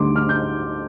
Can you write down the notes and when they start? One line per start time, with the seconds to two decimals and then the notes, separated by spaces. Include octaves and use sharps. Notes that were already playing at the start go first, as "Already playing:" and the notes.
Already playing: D2 D3 G3 C6 D6
0.16 F6
0.29 G6